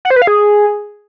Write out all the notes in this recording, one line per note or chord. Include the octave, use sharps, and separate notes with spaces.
F#5
C5
B4
F5
G#4